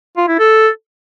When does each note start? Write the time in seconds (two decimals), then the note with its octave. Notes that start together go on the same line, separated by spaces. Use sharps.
0.17 F4
0.28 E4
0.39 A4